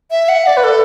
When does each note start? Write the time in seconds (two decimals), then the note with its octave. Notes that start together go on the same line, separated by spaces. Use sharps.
0.11 E5
0.29 F#5
0.46 D5
0.57 B4
0.64 A4